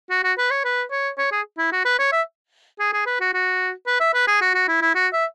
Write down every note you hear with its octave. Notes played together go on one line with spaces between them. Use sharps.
F#4
F#4
B4
C#5
B4
C#5
C#5
G#4
E4
F#4
B4
C#5
E5
G#4
G#4
B4
F#4
F#4
B4
E5
B4
G#4
F#4
F#4
E4
E4
F#4
E5